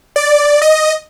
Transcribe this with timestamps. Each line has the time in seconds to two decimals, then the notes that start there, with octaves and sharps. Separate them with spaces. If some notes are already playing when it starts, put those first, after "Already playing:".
0.16 D5
0.62 D#5